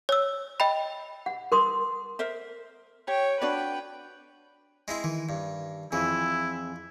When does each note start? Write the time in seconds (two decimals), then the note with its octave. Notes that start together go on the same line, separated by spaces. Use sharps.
0.09 C#5 E6
0.60 D#5 G5 B5
1.26 F#5
1.52 A#4 C6 D#6
2.19 A#4 C5 E5
3.08 G4 C#5 G5
3.42 D4 F#4 B4 D5 G5
4.88 G#3 C4 E4
5.04 D#3 E3
5.29 G2
5.92 F2 E3 C4 E4 G#4 G#5